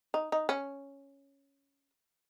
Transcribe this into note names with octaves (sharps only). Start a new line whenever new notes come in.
D#4
D#4
C#4